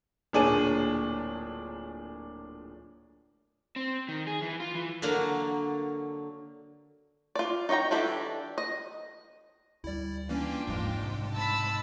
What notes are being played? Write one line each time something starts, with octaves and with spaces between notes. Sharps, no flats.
D1 A#2 D4 G#4 C#5 D#7
C4
D#3
G#4
E3
F4
E3
D3 F#3 A#3
F4 D5
D#4 C#5 D#5 G5 A#5
E3 D4 G4 A4
D#5
D2 G3 E4 D5
E3 A#3 C#4 D4 F4 G5
F1 D#2 G#2 F3 G#3
B1 C3
A5 B5 E6